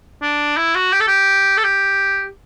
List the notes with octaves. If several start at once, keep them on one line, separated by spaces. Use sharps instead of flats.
D4
E4
F#4
G4
A4
G4
A4
G4